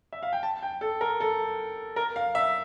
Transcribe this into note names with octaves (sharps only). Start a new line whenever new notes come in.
E5
F5
G5
A5
G5
A4
A#4
A4
A#4
F5
E5